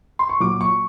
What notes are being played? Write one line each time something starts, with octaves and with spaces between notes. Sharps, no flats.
C6
C#6
A#2 F#3 D6
C#6